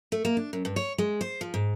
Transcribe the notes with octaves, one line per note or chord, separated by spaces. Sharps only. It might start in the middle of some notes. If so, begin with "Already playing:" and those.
A3
A#3
D4
F#2
G2
C#5
G#3
C5
F3
G#2